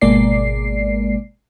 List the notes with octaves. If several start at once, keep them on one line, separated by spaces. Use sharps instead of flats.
G#1 B2 G#3 A#3 D5 C7